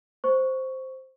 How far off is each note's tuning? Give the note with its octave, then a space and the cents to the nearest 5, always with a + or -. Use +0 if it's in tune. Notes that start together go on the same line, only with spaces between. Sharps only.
C5 +0 C#6 +5